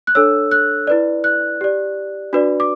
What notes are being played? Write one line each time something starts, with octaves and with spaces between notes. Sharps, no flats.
F#6
D4 A4 C#5 E6
F#6
E4 B4 D5
F#6
G4 D5
D4 F#4 B4 D5
D6